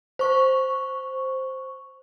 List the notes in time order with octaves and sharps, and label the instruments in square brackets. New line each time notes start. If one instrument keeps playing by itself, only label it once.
[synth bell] C5 C#6